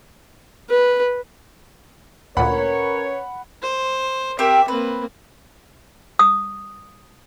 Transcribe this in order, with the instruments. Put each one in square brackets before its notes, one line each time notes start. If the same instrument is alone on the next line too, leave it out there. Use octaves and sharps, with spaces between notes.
[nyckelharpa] B4
[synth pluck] D2 A#2 [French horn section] C#4 B4 C#5 [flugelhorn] A#4 [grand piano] F#5 B5
[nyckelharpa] C5
[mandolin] C4 G4 A#4 [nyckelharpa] E5
[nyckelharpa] A#3 C4 [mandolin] B4
[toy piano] D#6